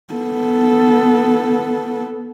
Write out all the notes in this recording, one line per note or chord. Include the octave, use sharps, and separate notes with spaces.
B3 A4